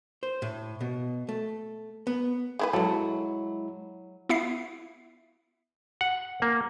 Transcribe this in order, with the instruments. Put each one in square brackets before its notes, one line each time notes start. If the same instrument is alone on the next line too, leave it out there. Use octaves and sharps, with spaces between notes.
[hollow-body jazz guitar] C5
A2
B2
A3
B3
[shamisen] G#3 E4 B4
[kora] F#3 [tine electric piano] G#3 E4 [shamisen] A3 A4
[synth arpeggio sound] B3 E4 E5 F5 C7
[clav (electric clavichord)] F#5
A#3